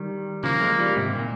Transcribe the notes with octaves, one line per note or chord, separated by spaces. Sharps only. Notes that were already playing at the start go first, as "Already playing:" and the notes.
Already playing: D#3 G3
C#3 F3 A#3
F3 G#3
D#3 G3
G#2 C3
A#2